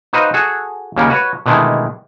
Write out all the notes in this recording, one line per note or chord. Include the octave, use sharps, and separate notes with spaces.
D#4 F#4 B4 C5 D#5 F5
F#4 G#4 A4
D#2 C#3 G3 A#3 C#4
F#4 B4 C#5
B2 D3 D#3 G#3 A3 E4